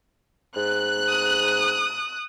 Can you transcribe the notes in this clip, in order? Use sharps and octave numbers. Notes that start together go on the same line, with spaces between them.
G#2 F#6
D#6